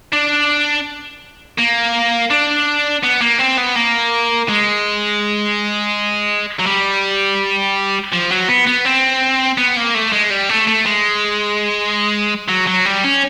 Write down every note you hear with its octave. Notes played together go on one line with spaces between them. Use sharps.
D4
A#3
D4
B3
A#3
C4
B3
A#3
G#3
F#3
G3
F3
F#3
B3
B3
C4
B3
A#3
A3
G#3
G3
A3
A3
G#3
F#3
F#3
G3
C#4